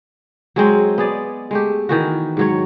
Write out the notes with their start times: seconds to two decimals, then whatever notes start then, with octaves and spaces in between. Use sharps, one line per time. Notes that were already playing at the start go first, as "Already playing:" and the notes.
0.56 F#3 G#3 C4 C#4
0.98 B3 G#4 D5
1.51 G#3 A3 G4
1.89 D#3 E3 F#4
2.37 G#2 F#3 C#5